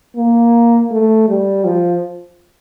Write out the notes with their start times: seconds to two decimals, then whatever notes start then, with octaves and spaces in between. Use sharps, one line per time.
0.17 A#3
0.91 A3
1.28 G3
1.65 F3